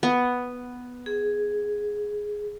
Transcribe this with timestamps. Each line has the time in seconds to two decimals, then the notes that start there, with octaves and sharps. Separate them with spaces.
0.03 B3
1.06 G#4